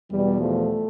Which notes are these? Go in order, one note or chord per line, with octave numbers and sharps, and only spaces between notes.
E2 B2 G3
F3 A3